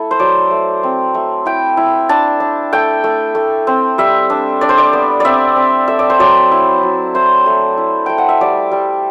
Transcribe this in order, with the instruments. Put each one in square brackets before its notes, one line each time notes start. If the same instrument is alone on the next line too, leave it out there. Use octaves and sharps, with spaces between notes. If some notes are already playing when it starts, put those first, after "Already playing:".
Already playing: [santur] A3 E4 A4
C5
F#3 D5
A3
C4
A3
E4 G5
E4
D4 A5
D4
A3 G5
A3
A3
C4
G3 E5
D4
D4 D5
C5
D5
B3
C4 D5 E5
C4
A3 E5
D5
C5
F#3 D5
E4
F#3
E4 C5
A3
E4
A3 G5
F#5
E5
G3 D5
G3